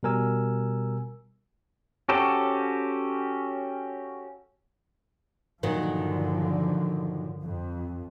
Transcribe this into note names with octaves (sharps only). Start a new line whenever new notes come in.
B2 G3 A#4 G#5 E6
C#4 F#4 G4 A4 C5
G2 A#2 D3 D#3 F3 F#3
F2